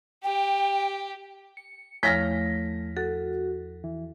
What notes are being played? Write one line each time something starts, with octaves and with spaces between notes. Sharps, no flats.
G4 G5
C#7
E2 F3 A3 C#5 F6 A#6 B6
F#4 A4
E3